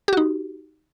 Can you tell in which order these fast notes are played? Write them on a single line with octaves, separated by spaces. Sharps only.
G4 F#4 D#4